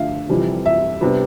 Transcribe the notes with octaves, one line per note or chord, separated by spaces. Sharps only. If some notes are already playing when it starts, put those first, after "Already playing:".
Already playing: F2 D3 A3 E5 F5
F1 F2 C3 E3 G3
E5
C3 G3 B3 D4